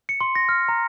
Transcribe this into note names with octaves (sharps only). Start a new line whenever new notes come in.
C#7
C6
A#6
F6
A#5